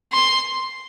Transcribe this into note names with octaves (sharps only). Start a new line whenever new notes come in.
C6